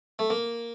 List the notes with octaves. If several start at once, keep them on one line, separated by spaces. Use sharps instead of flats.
A3
A#3